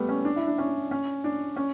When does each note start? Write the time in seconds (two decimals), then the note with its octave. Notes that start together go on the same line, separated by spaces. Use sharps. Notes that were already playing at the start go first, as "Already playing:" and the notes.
Already playing: G3 A3 B3
0.09 C#4
0.25 D4
0.36 E4
0.47 D4
0.58 C#4
0.91 C#4
1.24 D4
1.56 C#4